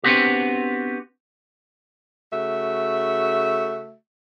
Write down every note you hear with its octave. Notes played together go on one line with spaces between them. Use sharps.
B3 C4 D4 F#4 G4
C#3 A3 F#4 E5